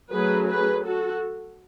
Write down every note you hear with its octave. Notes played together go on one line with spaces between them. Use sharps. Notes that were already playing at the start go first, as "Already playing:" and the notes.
F#3 A3 C#4 G#4 B4
G#4 B4
F#4 A4